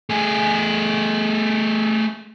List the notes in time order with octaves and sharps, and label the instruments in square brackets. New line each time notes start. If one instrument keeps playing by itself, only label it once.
[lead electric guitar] A3 G#4